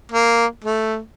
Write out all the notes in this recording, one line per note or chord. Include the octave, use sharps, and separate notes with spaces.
A#3
A3